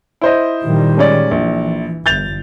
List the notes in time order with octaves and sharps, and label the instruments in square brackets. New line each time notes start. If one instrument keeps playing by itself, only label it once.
[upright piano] E4 C5 D#5
[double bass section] A#2 D#3 G3
[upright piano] G#3 C#4 D5
[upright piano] A#1 [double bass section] E3
[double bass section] G1 [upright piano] G6 A6 F7